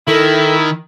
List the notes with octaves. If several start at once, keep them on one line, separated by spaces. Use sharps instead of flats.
D#3 E4 A4